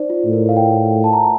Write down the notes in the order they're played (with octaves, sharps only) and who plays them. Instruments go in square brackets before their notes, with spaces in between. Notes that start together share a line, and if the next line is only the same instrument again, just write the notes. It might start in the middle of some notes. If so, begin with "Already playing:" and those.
Already playing: [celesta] D#4 C5 D5
F4
[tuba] A2
[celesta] A#4
F5
G5
A5
A#5
A5